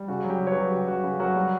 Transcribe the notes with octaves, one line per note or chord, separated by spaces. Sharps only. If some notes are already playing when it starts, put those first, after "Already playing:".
Already playing: G3
C#3 F#4
F#3
G4
C#3
C#5
G4 B4
F#3
F#4
C#3 G4
F#3 F#4
C#3
F#3 F#4 A#4
G3